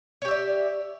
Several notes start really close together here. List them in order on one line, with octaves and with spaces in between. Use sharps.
C#5 G4 E5 D5